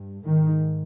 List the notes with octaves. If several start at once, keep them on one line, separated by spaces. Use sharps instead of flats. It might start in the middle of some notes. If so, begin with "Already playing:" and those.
Already playing: G2
G#2 D#3